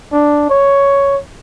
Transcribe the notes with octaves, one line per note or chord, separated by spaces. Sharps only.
D4
C#5